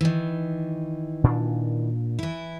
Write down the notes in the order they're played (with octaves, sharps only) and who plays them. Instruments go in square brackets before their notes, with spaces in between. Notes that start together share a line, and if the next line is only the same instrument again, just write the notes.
[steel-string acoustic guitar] D#3 E3
[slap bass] A#2 D4
[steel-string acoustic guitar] E3 E4